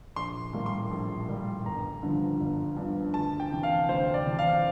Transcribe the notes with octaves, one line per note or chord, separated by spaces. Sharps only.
A#1 C6
A2 G3 A#3
C6
A#1
A2 G3 A#3
G1 A#5
G2 D3 F3
G1
G2 D3 F3
D2 A5
G5
C3 E3
F5
D2 C5
D5
C3 E3
F5